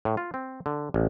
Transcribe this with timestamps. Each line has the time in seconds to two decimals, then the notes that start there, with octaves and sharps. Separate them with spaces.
0.05 A2
0.17 F4
0.34 C4
0.66 D3
0.94 A1